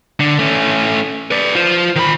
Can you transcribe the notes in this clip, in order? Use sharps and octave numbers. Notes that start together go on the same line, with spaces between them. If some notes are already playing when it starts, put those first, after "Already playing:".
D3
A3 C#4
B4 D5
F4 C5
D#3 B5